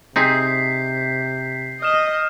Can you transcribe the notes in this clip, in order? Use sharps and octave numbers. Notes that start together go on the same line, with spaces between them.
C3 C4 D#4 G#4 G6 B6 C7
D#5 F6 E7